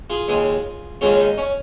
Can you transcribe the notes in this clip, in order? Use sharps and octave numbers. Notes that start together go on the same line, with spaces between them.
F4 G#4
D#2 C#3 G#3
D#2 C#3 G#3 C#4 F4
D#4
C#4